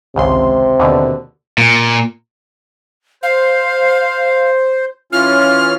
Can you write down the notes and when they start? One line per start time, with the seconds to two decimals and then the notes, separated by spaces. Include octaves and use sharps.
0.16 G#1 C#2 C3 C6
0.79 D#2 B2 D3
1.58 A#2
3.23 C5 F5
5.12 E3 C#4 F4 F6